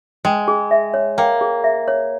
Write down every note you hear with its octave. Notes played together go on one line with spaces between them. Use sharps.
G#3 G5
G#4
E5
C#5
A#3 G5
G#4
E5
C#5